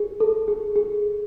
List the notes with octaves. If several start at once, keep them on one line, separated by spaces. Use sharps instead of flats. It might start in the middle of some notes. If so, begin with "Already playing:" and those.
Already playing: G#4
A4
G#4
G#4